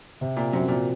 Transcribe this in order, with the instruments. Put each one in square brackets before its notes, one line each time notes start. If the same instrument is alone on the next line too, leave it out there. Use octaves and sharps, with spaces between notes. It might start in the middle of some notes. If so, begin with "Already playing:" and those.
[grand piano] C3
[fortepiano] A#2
[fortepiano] F#2 [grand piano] F3 C4 F#4
[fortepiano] A#2